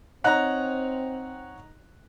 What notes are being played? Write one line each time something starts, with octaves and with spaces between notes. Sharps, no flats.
C4 D#4 C#5 F#5 A#5 F#6